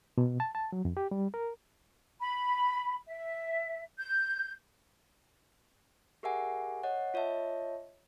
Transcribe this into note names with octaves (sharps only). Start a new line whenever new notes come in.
B2
A5
A5
F#3
F2
G4
G3
A#4
B5
E5
G6
G4 G#4 A#4 E5 F#5 G#5
C#5 D#5 F#5
F4 C#5 D#5 E5 A5